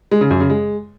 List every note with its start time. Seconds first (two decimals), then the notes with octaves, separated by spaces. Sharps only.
0.11 G#3
0.21 C#3
0.31 F#2
0.40 C#3
0.50 G#3